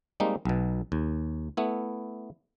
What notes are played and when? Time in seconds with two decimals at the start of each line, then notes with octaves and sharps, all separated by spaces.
0.20 G3 G#3 A#3 C4 D#4
0.45 B1 B2
0.92 D#2
1.57 A3 B3 E4